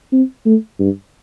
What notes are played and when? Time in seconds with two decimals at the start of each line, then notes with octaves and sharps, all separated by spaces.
0.13 C4
0.46 A3
0.80 G2